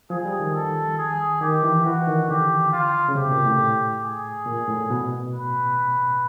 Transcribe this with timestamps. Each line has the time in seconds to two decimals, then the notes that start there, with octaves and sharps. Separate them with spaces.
0.10 F3 G#4
0.25 G3
0.39 D#3
0.54 A4
0.98 G#4
1.41 D#3 G4
1.63 E3
1.85 E3 F#4
2.07 D#3
2.29 D3 G4
2.72 F4
3.09 C#3
3.16 C3 G4
3.31 A#2
3.45 A2
4.03 G#4
4.46 A#2
4.68 A2
4.90 B2
5.34 B4